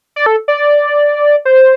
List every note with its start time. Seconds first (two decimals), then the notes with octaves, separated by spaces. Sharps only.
0.16 D5
0.26 A4
0.48 D5
1.45 C5